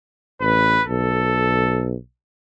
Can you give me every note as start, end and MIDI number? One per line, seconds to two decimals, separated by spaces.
0.41 0.79 33
0.41 0.82 71
0.87 1.94 35
0.87 1.88 69